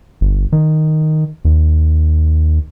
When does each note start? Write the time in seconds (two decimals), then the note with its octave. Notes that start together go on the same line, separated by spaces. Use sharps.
0.21 G1
0.52 D#3
1.45 D#2